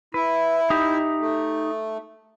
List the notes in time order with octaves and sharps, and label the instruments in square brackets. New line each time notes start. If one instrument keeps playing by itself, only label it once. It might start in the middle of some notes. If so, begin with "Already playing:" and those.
[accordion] E4 [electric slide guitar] B4
[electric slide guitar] D#4 G4 E5
[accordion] A3